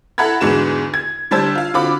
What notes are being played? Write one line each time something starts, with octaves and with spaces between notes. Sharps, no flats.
E4 A4 F#5 A#5 B5 G#6
E2 G#2 D3 G#3 F#4 E7
G#6
D3 G3 C5 A5 E6 G#6
F4 F5
D3 C4 F4 F#4 B5 D6